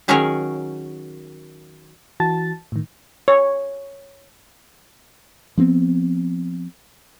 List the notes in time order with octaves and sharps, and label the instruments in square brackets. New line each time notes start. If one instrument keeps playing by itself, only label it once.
[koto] D#3 F#3 C#4 G#4 A#4 C#5
[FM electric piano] E3 F#4 A5 A6
A2 D#3
[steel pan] C#5
[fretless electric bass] F3 B3 C4